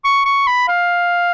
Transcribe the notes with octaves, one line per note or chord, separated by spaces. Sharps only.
C#6
C#6
B5
F5